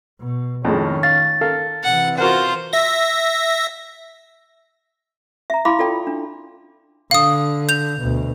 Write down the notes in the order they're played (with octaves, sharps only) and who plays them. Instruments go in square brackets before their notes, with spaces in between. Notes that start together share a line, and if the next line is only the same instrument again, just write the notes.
[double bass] B2
[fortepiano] F2 A2 G#3 [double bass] D#3 C#4
[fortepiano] F5 [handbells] A6
[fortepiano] A4 A#4 F5
[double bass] C3 E3 [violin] F#5
[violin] F4 C5 [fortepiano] F#4 A#4 F#5
[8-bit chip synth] E5 A#6
[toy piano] E5 A#5
E4 F5 B5 C6 D6
F4 A4 D5 G5
D4
[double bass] D3 [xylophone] F5 D#6
[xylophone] G6 F7
[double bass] D2 B2